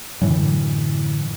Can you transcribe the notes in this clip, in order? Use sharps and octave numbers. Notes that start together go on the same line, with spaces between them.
F#2 A2 D3 E3